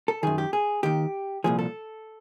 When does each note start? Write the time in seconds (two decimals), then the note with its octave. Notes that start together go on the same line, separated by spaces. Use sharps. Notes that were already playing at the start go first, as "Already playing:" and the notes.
0.08 A4
0.23 F#2 D#3 G#4
0.38 G4
0.53 G#4
0.83 D#2 D#3 G4
1.44 C2 A#2 F3 G#4
1.59 A4